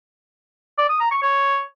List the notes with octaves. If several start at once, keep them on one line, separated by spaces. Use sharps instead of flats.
D5
D#6
A#5
C#6
C#5